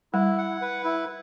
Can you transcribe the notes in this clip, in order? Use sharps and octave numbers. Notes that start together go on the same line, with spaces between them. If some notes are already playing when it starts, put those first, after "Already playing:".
G3 E4
F#5
B4
E4